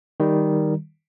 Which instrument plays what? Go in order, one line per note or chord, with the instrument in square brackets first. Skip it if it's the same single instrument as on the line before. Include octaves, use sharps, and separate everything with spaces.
[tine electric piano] D#3 G3